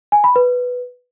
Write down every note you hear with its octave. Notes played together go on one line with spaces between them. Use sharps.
G#5
B5
B4